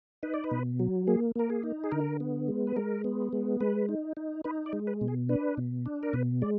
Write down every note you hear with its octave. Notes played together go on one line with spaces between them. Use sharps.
D#4 B4
D5
B4
B2
F#3
A#3 G#4
A#3 A#4
G#4
D#4
G#4
D3 A#4
B3
G#3
B4
G#3 A#4
B3
G#3
G#3 B4
D#4
D#4
D#4 B4
D5
G#3
B4
B2
G#4
D4 B4
B2
D4
A#4
B2 B4
G#3 D5